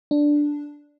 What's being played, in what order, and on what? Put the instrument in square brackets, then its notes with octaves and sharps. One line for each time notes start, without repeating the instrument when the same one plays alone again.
[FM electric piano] D4